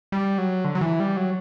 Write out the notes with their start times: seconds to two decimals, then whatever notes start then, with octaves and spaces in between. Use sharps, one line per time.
0.12 G3
0.38 F#3
0.65 D3
0.75 F#3
0.81 E3
1.00 G3
1.17 F#3